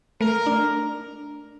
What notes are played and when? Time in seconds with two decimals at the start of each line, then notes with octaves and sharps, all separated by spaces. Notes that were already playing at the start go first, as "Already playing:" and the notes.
0.20 A3 A#4
0.46 D4